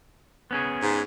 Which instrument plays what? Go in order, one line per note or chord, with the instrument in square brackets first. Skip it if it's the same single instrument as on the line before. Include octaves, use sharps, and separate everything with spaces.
[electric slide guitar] B3 C#4 G#4
[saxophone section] G#2